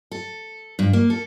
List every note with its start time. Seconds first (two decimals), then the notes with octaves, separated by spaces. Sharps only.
0.11 A4
0.79 G2
0.93 A#3
1.10 A4